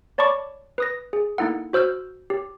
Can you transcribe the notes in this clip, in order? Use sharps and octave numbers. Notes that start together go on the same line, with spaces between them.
C#5 D5 A5 B5 C#6 D6
B4 D#6 A#6
G#4
A#3 D#4 E4 A4 F#5
F#4 C5 E6 F6 G6
G4